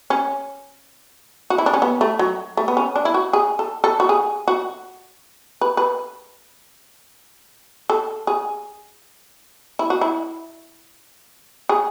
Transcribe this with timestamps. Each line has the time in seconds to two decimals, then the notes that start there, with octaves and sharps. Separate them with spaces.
0.10 C#4
1.50 F#4
1.58 E4
1.66 D4
1.73 C#4
1.82 B3
2.01 A3
2.19 F#3
2.57 A3
2.68 B3
2.77 C#4
2.96 D4
3.05 E4
3.14 F#4
3.33 G#4
3.59 A4
3.84 A4
4.00 F#4
4.09 G#4
4.48 F#4
5.61 B4
5.77 B4
7.90 A4
8.27 G#4
9.79 E4
9.90 F#4
10.01 E4
11.69 G#4